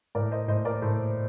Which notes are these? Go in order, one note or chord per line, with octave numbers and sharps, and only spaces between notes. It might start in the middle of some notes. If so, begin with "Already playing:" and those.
A2 A#4 D5
C5 D#5
A2 C5 D#5
A#4 D5
A2 A4 C5